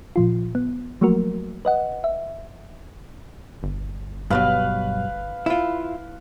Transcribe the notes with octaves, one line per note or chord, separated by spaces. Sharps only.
A#2 F3 F4
B3
F3 F#3 A3 A#3 F#4 A#4
B4 D#5 F#5
E5
G1
G2 B2 F#3 B4 F5
E4 F4